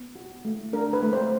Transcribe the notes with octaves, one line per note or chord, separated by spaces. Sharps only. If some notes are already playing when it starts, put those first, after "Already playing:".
Already playing: B3
F#4
A3
D4 A#4
B4
A3
C5